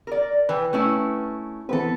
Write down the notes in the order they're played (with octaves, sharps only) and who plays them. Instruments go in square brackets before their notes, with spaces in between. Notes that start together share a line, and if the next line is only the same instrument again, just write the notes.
[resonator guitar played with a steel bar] A#4 D5
[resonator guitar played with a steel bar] E3 [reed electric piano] B4 G5
[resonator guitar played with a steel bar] A3 C#4 E4
[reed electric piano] E3 B3 C4 [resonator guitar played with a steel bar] A4 B4